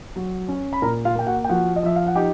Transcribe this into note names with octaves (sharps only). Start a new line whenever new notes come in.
F#3
C#4
B5
A#2 A#4 A#5
F4 F5
A#3 G5
F#4 F#5
G5
F3 F#4 F#5
D#5
F3 E5
F5
F#5
D#4 G4 G5